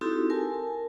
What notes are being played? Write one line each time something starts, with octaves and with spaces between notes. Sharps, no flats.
C4 D#4 E4 F#4 G4 A4
A#4 G#5 A5